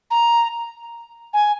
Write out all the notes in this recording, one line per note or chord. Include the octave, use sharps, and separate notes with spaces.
A#5
G#5